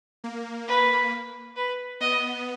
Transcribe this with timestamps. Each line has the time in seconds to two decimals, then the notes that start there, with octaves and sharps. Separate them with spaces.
0.24 A#3
0.68 B4
1.56 B4
2.00 B3 D#5